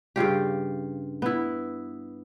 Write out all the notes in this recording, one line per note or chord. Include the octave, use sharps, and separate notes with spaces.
G2 C#3 F4 G4
B3 E4